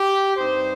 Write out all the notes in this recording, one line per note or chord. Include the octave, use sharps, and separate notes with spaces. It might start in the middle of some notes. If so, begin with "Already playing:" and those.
Already playing: G4
G2 G3 C4 D#4 C5